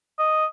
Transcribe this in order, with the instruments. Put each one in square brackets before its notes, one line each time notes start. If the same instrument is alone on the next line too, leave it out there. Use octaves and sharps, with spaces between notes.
[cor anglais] D#5